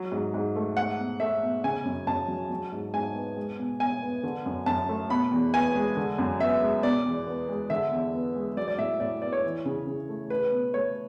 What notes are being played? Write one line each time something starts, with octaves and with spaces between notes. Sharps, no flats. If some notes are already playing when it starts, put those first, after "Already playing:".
Already playing: F#3
G#2
G#2
A3
A3 F#5
B2
A3 E5
B2
C#3 G#5
F#2
F#2 A5
F#3
F#3
G#2
G#2 G#5
B3
G#3
B2
B2 G#5
B3
D3
F#2
F#2 A5
A3
B2 B5
E2
B3 G#5
G#3
D3
F#2
B3 E5
G#3
B2 D5
E2
B3
G#3
D3 E5
E2
B3
G#3
F#3 D5
D5
A2 E5
A2 D5
B3 D5
C#5
E3
C#3
C#3
A3
A3 B4
B2
A3 C#5